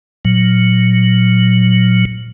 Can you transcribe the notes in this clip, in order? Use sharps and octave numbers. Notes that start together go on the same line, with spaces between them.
A#2 F#3